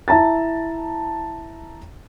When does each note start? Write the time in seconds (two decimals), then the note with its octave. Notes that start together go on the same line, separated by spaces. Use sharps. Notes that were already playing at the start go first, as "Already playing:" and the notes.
0.08 E4 E5 A5 A#5 A6